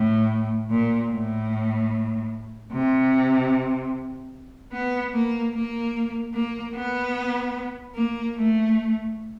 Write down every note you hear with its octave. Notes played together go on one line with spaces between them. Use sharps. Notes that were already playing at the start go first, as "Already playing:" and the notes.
Already playing: A2
A#2
A2
C3
B3
A#3
A#3
A#3
B3
A#3
A3